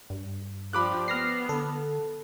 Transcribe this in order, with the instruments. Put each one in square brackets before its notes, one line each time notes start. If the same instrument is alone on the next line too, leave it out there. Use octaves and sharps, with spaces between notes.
[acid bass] G2
[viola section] F3 D4 G4 [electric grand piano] B5 D6 F#6
[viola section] B3 [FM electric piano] F6 A#6 C7
[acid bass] D3 [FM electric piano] A4